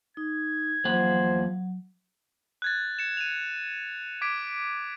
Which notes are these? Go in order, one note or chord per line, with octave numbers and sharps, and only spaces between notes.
D#4 G#6
E2 F3 F#3 A#3 C5 F#5
F#6 G#6 A6
C#7 E7
D#7 F7
D6 G#6 B6 D7